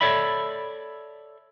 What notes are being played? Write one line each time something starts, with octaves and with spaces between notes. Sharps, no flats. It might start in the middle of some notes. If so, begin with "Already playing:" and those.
A4 C#5 D5 E5 B5